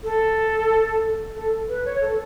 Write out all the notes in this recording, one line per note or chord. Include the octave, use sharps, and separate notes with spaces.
A4
A4
B4
C#5
A4